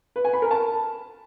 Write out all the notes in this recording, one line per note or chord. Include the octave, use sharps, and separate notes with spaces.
B4
G#5
B5
A#4
A5